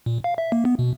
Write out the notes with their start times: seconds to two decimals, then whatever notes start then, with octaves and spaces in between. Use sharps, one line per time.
0.06 A#2
0.24 F5
0.38 E5
0.52 A#3
0.65 B3
0.79 B2